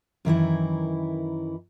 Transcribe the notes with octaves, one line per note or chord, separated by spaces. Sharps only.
F#2 D#3 E3 E4